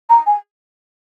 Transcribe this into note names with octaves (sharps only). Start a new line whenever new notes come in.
A#5
G#5